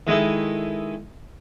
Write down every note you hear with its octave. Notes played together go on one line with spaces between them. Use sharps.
D#3 G#3 D#4 E4 A4